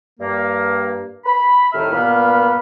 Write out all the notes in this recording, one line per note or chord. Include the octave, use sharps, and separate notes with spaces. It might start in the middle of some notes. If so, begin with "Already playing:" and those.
G2 A#3
B5
C2 A2 C3 D#3 E5 F6
G2 A#2 A#3 B3 B5 F6